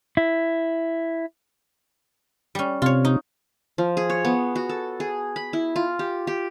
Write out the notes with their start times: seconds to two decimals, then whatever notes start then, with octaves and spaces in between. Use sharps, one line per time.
0.17 E4
2.55 G3 C#4
2.82 C3 F4 C#5
3.05 D#4
3.78 F3
3.97 G#4
4.10 C#5
4.25 B3
4.56 F#4
4.69 A4
5.00 G#4
5.36 B5
5.53 E4
5.76 F4
5.99 G4
6.27 G4